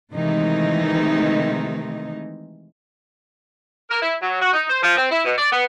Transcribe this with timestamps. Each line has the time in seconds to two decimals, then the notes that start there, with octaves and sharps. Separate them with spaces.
0.13 C3 D#3 E3 G#3 A3 D#4
3.90 A#4
4.02 E4
4.21 F#3
4.42 F#4
4.53 D#4
4.70 C5
4.83 F3
4.96 C4
5.10 E4
5.25 B2
5.38 D5
5.53 B3